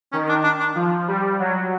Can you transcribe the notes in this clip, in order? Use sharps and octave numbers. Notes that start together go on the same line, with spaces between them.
D#3 C#4
D4
D4
D4
F3
G3
F#3